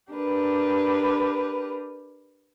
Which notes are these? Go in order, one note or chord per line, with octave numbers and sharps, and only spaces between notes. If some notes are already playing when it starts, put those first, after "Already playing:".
D4 G4 A#4 B4